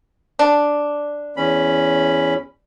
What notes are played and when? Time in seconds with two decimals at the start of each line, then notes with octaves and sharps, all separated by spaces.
0.39 D4
1.37 E2 C#4 B5